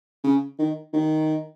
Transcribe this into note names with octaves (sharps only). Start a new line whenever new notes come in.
C#3
D#3
D#3